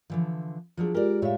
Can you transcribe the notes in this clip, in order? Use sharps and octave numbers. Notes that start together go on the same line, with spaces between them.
D3 E3 F3
F3 F#3 D4 F4 G#4
G#3 F4 G4 A#4 D5
A2 A3 C#5 E5 F5